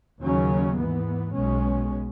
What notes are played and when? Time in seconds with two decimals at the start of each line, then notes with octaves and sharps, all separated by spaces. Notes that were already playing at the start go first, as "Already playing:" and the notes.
0.21 D#2 C#3 F#3 C#4
0.78 G#2 E3 B3
1.35 B1 B2 G#3 C#4